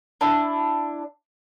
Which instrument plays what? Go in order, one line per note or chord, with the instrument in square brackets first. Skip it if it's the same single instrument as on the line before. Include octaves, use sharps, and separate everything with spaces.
[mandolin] D4 E4